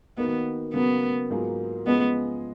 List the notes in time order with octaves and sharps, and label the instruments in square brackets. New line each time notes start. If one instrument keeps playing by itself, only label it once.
[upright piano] D#3 A#3 D#4 F#4 [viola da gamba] B3
[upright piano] C#3 F#3 A#3 [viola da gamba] B3
[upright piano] G#2 F#3 A#3 F4 G#4
[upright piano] F3 G#3 C#4 G#4 D#5 [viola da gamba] B3